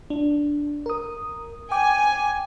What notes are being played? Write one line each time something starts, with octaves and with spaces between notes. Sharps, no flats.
D4
A#4 D#6
G5 G#5 D6